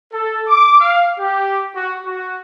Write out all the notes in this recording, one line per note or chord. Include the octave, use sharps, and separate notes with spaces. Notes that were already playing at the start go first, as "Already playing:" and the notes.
A4
D6
F5
G4
F#4
F#4